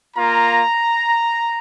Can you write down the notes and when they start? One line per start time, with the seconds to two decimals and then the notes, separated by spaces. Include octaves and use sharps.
0.16 A#3 F4 A#5